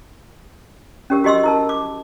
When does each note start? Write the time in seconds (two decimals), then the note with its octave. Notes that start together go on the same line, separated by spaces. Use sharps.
1.10 C#4 G4 A#4
1.24 F#4 G4 D#5 C6 E6
1.44 E4 A#4 A5
1.69 D6